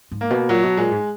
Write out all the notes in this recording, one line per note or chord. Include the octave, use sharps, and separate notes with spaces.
G#2
A#3
B2
A#2 F#3
B2
A#2 G#3
G#2